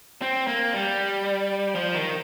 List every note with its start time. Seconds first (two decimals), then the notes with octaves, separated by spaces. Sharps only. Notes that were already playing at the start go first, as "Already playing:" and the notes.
0.22 C4
0.47 A#3
0.73 G3
1.75 F3
1.94 D#3